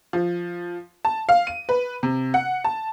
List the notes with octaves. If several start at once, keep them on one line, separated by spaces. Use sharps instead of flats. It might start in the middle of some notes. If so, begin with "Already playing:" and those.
F3
A5
F5
D#7
B4
C3
F#5
A5